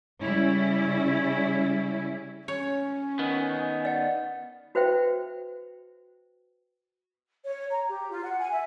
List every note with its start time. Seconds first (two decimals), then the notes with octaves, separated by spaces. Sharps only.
0.19 C#3 G3 C#4 E4
2.48 C#4 C#5
3.19 D#3 B3
3.85 D5 F#5
4.75 F#4 B4 C5 E5 G5
7.45 C#5
7.71 A#5
7.88 G4
8.10 F4
8.23 F#5
8.39 G#5
8.52 E5